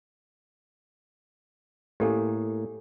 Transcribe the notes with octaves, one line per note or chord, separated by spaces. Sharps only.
A2 A#3 G4 A4 G#5